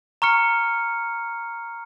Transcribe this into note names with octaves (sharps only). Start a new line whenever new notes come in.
A#5 C#6 F6 C#7